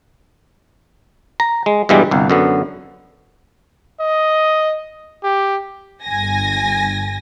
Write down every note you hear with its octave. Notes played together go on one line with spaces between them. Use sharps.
A#5
G#3
G2 B2 E3 G3 G#3
G1 C2
F#2 D3 B3
D#5
G4
G1 G#5 A#6